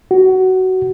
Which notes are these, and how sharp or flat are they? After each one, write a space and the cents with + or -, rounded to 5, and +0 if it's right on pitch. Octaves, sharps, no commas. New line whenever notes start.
F#4 +15